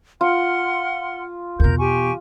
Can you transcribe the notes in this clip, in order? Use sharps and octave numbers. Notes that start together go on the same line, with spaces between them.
F4 F#5 C6 F6
E2 B2 A#4 G6
G4 G#5 C#6